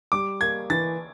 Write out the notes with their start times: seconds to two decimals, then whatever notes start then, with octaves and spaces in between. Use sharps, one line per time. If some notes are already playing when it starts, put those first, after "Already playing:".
0.12 G3 D6
0.41 A#3 G#6
0.70 E3 A6